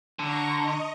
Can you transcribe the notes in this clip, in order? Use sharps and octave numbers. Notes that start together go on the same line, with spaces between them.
D3 A#5 C#6
D#5